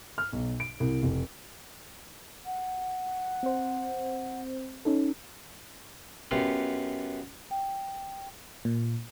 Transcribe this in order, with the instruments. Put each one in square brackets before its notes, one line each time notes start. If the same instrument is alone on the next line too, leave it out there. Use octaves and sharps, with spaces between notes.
[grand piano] F6
B1
D7
C2
F1
[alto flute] F#5
[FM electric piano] C4 C5
C#4 D#4 A4
[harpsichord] F#2 B3 F4 G4
[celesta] G5
[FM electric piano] A#2